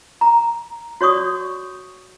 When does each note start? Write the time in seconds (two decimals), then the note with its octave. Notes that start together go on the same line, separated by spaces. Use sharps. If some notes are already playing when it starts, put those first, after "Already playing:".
0.21 A#5
1.01 F#4 C#5 D5 C#6 D#6